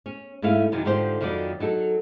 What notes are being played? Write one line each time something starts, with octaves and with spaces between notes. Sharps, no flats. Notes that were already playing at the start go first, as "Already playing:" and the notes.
C#4
G#2 A3 C#4 E4 F5
F#2 C3 D#3 E3 F#3
G#2 D3 F3 G4 C5
F2 D#3 F#3 G3 D5
F#3 D#4 A4